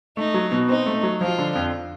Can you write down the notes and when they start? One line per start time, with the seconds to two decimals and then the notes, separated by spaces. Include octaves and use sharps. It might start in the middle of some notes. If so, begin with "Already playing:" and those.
0.17 A3 D#4
0.34 F#3
0.52 B2
0.69 C4 D#4
0.86 A3
1.03 F#3
1.21 F3 F4
1.38 D3
1.55 F2